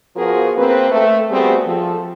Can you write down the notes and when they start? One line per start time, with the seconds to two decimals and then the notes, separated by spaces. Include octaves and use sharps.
0.16 F3 B3 F4 F#4 G#4 A#4
0.56 A#3 C4 B4
0.91 A3
1.31 G3 A3 B3 C4 F#4 G#4
1.66 F3 A4